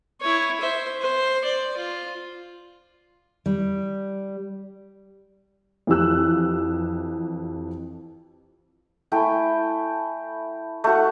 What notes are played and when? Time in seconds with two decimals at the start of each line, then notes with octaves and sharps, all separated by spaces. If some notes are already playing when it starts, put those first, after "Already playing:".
0.21 E4 C#5
0.60 C5 E5
1.00 C5
1.44 D5
1.77 F4
3.46 G3
5.87 F2 E3 G4 E6 F#6
9.12 A3 E4 G5 G#5
10.84 A3 F#4